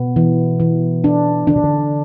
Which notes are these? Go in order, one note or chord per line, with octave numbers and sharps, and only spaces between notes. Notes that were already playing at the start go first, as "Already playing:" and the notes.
Already playing: B2 B3
E3
E3
D4
D3 D4
B2
D3